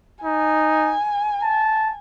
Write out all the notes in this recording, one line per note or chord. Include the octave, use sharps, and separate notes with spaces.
D#4 G#5
A5